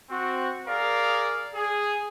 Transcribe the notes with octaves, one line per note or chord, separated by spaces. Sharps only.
C4 F#4
G#4 A#4 D5 F5
G#4